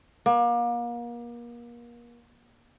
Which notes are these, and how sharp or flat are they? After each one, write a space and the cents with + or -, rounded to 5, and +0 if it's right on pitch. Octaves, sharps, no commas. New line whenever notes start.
A#3 +35